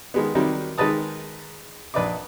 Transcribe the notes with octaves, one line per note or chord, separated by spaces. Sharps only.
D#3 G#3 B3
C3 D#3 F#3 G3
D#3 G#3 D#4 B4 A5 D#6
A#1 B4 D5 D#5 D6